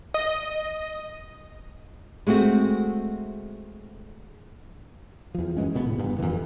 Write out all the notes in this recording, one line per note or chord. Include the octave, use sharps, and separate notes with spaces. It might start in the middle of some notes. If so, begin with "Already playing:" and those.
D#5
G#3 A3 C4 F#4
E2 F3
F#2 E3 G#3 C#4
D2 B2 G3 B3
A2 C#3
G2 B3
F2 C3 D#3 E3